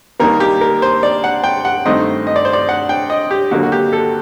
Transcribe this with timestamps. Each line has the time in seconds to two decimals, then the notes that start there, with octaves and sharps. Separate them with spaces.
0.20 D#2 D#3 G3 A#3 A#4
0.40 G4
0.61 A#4
0.82 C5
1.03 D5
1.24 F#5
1.44 G5
1.65 F#5
1.85 G2 D#3 A3 C4 D#5
2.27 D#5
2.36 D5
2.45 C5
2.53 D5
2.69 F#5
2.89 G5
3.10 D#5
3.31 G4
3.51 D#2 D3 F#3 A#3 F#4
3.63 F#4
3.72 G4
3.93 A4